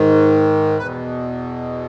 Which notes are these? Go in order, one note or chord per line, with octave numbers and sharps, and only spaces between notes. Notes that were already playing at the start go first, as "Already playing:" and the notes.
Already playing: G#2 D#3
E2 B2 B4